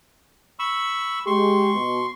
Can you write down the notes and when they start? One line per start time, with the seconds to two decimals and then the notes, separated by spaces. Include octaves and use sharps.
0.59 B5 C#6 E6
1.27 G#3 G4 C6 C#6
1.75 B2